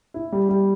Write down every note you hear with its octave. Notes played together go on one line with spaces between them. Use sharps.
E4
G3
G3